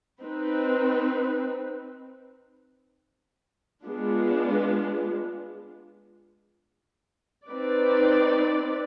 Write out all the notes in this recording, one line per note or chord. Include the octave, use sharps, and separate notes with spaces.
C4 D#4 B4
G#3 B3 D4 F4
C4 D#4 B4 D5